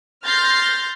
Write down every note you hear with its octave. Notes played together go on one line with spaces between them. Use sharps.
C6 F6 G6 A6 A#6 C7